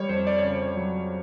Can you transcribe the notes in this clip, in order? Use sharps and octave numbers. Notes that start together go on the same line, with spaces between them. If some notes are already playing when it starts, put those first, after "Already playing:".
Already playing: G3 C#5
F2 C5
D5
C#3 C#5
C5
C#5
F#3